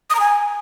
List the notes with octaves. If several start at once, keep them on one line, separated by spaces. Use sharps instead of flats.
D#6
A#5
G#5